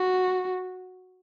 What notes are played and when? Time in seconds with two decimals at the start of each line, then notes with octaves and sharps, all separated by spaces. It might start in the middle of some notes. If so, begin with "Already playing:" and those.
Already playing: F#4